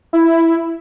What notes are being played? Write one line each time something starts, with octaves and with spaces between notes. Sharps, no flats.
E4